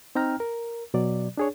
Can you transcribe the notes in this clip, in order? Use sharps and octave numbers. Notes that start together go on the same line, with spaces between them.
C4 D#4 G5 A#5 F6
A#4
B2 F#3 D5
D4 G#4 C#5